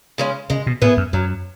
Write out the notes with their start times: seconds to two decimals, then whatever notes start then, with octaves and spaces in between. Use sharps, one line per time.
0.18 C#3 G#3 C#4
0.50 C#3 G#3
0.67 B2
0.82 A2 B3 E4 G#4
0.97 F#2
1.13 F#2 F#3